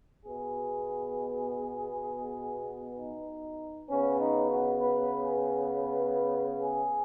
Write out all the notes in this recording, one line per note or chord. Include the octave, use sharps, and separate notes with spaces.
B2 B3 G#4
D#4
C#3 B3 C#4
D#4
F#4
B4
G#4
B4
G#4